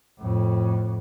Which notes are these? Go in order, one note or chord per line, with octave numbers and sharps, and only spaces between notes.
F2 A2